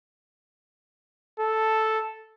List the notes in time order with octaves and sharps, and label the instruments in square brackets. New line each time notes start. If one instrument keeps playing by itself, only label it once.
[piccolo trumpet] A4